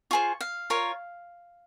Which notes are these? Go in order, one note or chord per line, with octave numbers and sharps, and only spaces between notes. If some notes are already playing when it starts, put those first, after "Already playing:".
F4 G#4 C5 C#6
F5
F4 A#4 C#5